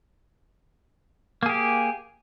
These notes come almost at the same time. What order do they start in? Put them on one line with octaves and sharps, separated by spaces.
A#3 G#4 G4